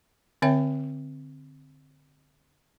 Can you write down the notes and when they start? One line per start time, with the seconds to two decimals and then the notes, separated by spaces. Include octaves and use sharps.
0.42 D3 C4 C#5 E5 G5